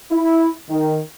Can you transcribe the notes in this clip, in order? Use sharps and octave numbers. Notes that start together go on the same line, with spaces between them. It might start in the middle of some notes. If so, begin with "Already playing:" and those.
E4
D#3